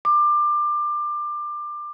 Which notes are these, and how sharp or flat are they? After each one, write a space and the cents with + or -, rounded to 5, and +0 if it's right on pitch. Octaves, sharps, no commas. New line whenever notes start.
D6 +25